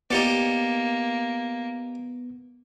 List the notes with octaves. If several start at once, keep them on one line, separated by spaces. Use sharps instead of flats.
A#3 B3 D#4 G4 D5 C#7